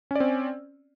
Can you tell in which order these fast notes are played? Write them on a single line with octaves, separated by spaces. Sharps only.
C#4 D5 C4